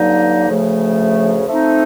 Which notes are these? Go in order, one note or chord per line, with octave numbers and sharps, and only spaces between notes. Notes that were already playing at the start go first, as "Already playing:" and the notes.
Already playing: G2 D3 F#3 A#3 D#4
D2 C#3 F3 A3 C#4
F3 A3 C4 D#4